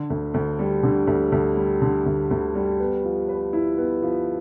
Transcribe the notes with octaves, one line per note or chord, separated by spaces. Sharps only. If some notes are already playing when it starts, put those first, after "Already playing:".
Already playing: D3
D2
D2
G3
D3
D2
D2
G3
D3
D2
D2
G3
B3
F3
B4
E4
B3
F3